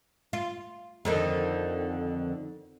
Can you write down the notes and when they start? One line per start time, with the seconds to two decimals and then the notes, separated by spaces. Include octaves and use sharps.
0.33 F4
1.05 F2 D3 D#3